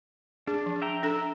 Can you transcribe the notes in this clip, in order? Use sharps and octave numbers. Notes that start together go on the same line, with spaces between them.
D4 G#4
F3
E5 G5 A#5
D4 A4